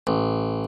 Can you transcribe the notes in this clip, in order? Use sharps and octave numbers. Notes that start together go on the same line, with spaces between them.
A1